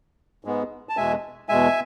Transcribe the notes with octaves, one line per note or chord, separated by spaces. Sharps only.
G#2 G#3 B3
A5
E2 B2 G#3 E5 G#5
E2 B2 G#3 E5 G#5